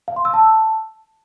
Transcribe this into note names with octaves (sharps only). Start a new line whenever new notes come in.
F5
C6
E6
A5